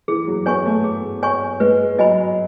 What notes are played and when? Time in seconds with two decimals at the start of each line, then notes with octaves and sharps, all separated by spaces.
0.08 E3 G#4
0.28 F#3
0.46 B3 C#5 G#5 C#6
0.65 A3
0.84 G#4
1.23 C#5 G#5 C#6
1.60 G#3 B4
1.99 F#3 D#5 G#5 B5